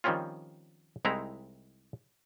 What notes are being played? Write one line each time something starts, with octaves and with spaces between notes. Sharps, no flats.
D#3 F3 G3 C4 C#4 F4
C2 G#3 C4 D#4 E4 A#5